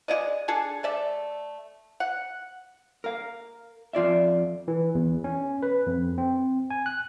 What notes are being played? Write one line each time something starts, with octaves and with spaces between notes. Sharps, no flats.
G#3 E4 D5 D#5
D4 G#4 A4
A3 D5 E5
F#5
A#4 F5
F2 F4 D5 E5
E3
E2
C#4
B4
F2
C4
G#5
F#6